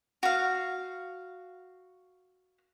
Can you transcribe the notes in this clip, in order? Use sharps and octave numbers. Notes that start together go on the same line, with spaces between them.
F#4 F5